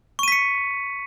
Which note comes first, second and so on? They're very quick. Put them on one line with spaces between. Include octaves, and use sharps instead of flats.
C#6 D#7 B6 C#7